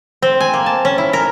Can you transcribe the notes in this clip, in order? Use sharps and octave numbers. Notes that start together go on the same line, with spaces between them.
C4
G#5
A#3
A5
C#4
E4
A#4